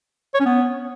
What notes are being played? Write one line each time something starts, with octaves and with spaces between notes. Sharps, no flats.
C#5
C#4
B3